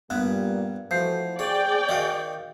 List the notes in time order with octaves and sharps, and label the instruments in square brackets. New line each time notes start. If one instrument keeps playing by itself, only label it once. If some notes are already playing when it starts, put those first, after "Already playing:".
[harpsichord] G2 B3 [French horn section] A#2 G3 [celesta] F#6
[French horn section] E3 A3 F#4 [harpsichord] F3 [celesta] C5 G6 C7
[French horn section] G#4 [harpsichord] C#5 [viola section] D5 G5
[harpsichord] D#3 F#4 F5